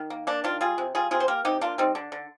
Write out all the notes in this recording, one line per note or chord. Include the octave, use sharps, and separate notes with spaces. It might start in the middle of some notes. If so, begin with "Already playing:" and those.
Already playing: D#3
A#3
A#3 D4
D#3 D4 F4
G3 F4 G#4
C3
G3 F4 G#4
C3 F4 G#4
C5
A#3 G4 A#4
C3 D#4 G4
A#3 D4 F4
G3 C4 D#4
D3 D4
D3